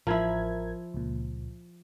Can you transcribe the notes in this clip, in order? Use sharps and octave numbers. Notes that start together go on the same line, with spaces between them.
A1 F3 E4 A#4 G#6
C#2 A#2